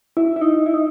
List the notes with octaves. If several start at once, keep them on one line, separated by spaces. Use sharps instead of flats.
E4
E4
D#4
E4
D#4